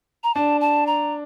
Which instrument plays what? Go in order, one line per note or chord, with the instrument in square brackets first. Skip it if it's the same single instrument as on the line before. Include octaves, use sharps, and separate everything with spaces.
[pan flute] A#5
[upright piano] D4 [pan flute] A5
[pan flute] A5
A#5